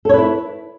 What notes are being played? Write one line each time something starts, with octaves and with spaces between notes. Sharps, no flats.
E4 A4 B4 C#5